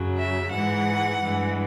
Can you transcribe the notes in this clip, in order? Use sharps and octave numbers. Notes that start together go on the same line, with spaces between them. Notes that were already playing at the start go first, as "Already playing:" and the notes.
Already playing: F#2 C#3 F#3
E5
G#2 E3 G#3 F#5
G2 E3 G#3